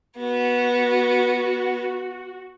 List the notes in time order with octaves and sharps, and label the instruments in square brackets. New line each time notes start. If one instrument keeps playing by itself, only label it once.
[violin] B3 [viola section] F#4